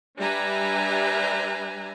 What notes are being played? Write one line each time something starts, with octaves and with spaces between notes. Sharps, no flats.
G3 D4 B4 E5 G#5 A#5